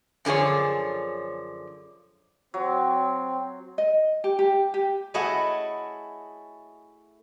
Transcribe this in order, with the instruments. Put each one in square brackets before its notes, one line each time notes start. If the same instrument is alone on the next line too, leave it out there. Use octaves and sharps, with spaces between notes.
[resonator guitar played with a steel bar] F#2 D3 F3 G#4 C#5
[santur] F#3 [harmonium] C4
[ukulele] D#5
G4
G4
G4
[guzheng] A3 E4 F#4 G#4 C#5 D#5